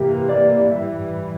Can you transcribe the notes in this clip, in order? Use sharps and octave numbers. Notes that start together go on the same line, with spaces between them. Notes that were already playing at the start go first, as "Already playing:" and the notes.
Already playing: C3 E3 A#3 G4
D5
E3 G3 E5